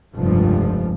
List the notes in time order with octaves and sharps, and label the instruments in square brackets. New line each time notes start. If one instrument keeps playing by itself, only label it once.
[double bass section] F1 C#2 G2 F3